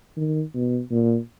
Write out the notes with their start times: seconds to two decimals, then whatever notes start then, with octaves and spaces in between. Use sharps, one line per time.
0.17 D#3
0.54 B2
0.91 A#2